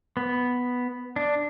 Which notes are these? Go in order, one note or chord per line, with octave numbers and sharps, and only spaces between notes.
B3
D4